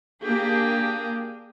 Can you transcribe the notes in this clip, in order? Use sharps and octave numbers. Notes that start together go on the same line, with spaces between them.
A#3 D4 G4 G#4